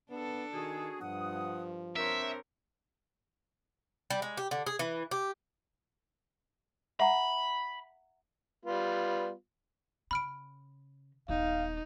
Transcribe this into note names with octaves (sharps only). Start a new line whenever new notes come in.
B3 D4 A4
D#3 F#4 G#4
G2 F3 F#5 D#6
C4 D4 A#4 C5 C#5 E5
G3
G#3
G4
D3
G#4
E3
G4
E5 F#5 A#5 B5
G3 B3 F4
C#3 B5 F6 D7
D#1 B3 D#4 F5